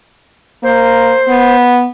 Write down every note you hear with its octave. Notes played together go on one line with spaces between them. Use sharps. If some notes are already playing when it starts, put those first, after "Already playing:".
A#3 C5
B3